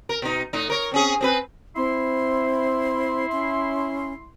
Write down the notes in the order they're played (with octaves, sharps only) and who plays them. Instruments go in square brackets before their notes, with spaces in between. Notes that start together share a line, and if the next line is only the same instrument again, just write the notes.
[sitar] A#4
B2 D#4
A2 D#4
A#4 C#5
C4 C#4 G#4
C4 G#4 B4
[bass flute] C4 [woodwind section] E4 C6
[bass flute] C#4